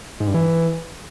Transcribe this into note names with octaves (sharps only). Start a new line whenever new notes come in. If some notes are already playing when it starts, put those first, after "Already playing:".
G#2
G2
E3